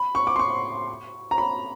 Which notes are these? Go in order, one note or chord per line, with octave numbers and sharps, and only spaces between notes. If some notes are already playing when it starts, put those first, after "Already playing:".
Already playing: B5
C#6
D6
C6
C#6
A#5
B5